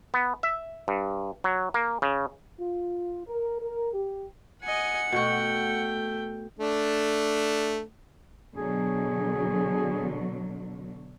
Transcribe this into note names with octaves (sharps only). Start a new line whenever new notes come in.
B3
E5
G2
F#3
A#3
C#3
F4
A#4
A#4
G4
D#5 F#5 G#5 C#7
B2 A3 F#4 G5
A3 D4
B2 D3 F#3 G#4